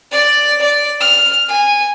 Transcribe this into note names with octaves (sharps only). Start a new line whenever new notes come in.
D5
D5
F6
G#5